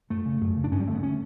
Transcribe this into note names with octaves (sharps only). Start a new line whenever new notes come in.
F#2 A3
C#3
F#2
C#3
D4
G2 C#4
G3
D3 A3
B3
C#4